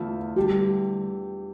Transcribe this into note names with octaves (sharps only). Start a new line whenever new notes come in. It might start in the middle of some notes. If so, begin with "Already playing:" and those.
Already playing: E2 D3 A3 D4 E4 F4
E2 D3 G3 D4 G4